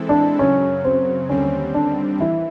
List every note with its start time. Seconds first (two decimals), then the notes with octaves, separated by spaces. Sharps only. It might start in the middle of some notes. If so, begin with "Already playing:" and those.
Already playing: E3 G#3 C4 E4 A4
0.09 D4
0.39 F#2 C#3 F#3 C#4
0.84 C4
1.29 D#2 D3 G3 C4 C#4
1.74 D4
2.20 E3 E4